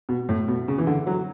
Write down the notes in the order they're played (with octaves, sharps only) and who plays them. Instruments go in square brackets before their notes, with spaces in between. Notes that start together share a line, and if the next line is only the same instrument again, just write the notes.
[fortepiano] B2
A2
B2
C#3
E3
D3
F#3